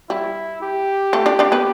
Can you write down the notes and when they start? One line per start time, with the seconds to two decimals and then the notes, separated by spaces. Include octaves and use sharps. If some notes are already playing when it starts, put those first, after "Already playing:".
0.10 G3 E4
0.62 G4
1.13 A3 A4
1.26 D4 D5
1.39 D4 D5
1.52 B3 B4